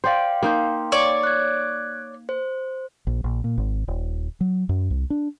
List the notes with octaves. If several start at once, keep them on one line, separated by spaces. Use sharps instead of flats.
C5 D5 F5 G5 C6
A#3 D#4 C5
C#5 D5
F#6 G#6
C5
A#1
A#1
A#2
G#1
D#1
F#3
F#2
C2
D4